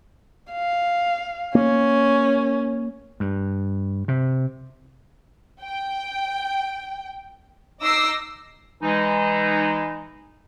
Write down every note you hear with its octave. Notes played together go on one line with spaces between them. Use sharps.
F5
A#3 C#4
G2
C3
G5
D#4 D#5 D6 E6 A#6 C7
E3 G#3 D#4